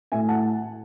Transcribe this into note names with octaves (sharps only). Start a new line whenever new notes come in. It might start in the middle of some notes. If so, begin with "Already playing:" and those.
A2 E5 G#5
F#5 A5